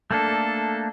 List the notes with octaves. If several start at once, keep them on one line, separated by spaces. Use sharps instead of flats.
A3 A#3 D4 A4